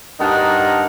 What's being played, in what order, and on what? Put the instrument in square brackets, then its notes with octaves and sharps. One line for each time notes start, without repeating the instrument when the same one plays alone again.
[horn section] G2 D4 D#4 A#4 D#5 F#5